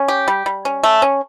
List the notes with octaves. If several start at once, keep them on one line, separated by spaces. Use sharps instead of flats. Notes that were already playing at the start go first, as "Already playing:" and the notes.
Already playing: C#4
G4
G3
G3
C#4
A3
C#4